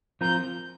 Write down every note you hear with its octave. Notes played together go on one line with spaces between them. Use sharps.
F3 C4 F4 A#4 G6